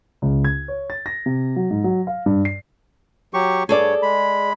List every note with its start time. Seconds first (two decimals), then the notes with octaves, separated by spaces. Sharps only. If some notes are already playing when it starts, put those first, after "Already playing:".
0.22 C#2
0.44 G#6
0.68 C#5
0.90 A6
1.06 A#6
1.26 C3
1.56 F#3
1.70 G#2
1.84 F#3
2.07 F5
2.26 G2
2.45 C7
3.34 F#3 G4 C#6
3.69 G2 G#4 A4 C#5 D5
4.02 G#3 B5